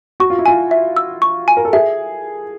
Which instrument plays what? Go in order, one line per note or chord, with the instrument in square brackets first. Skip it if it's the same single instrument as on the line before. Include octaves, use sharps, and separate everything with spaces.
[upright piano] F#4 [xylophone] C#6
[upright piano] F4
E4
[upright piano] F4 [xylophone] G#5
[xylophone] E5
E6
C#6
G#5
[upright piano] A#4
A4
[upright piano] G#4 [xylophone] E5